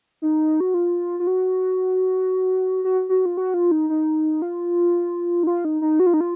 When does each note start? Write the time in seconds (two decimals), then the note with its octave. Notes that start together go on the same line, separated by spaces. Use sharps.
0.22 D#4
0.60 F#4
0.74 F4
1.20 F4
1.27 F#4
2.84 F#4
3.09 F#4
3.26 F4
3.37 F#4
3.54 F4
3.71 D#4
3.90 D#4
4.42 F4
5.43 D#4
5.47 F4
5.65 D#4
5.82 D#4
6.00 F#4
6.06 F4
6.14 D#4
6.21 F4